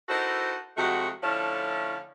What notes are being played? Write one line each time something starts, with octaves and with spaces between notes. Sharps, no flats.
D#4 E4 F#4 A4 A#4 C5
F2 C3 G#3 A3 F#4
D3 F3 A3 C#4 E4 A4